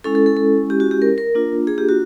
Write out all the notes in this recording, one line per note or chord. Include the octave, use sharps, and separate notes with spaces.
G#3 C#4 E4 A4
A4
A4
A4
G4
F#4
G4
A#4
A#4
A#3 D4 F4
G#4
G4
F#4